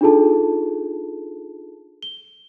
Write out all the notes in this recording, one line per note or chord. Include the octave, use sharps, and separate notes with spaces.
D4 D#4 F4 G#4 A4 A5
G7